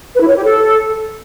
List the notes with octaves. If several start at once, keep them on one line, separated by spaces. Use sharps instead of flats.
B4
E4
C#5
G4
A4